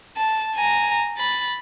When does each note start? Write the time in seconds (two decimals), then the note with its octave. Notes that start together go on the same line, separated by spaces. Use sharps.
0.17 A5
0.55 G#5 A#5
1.18 B5 A6